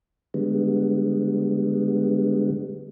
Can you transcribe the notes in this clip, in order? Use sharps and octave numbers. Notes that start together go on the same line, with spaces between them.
D3 G3 G#3 B3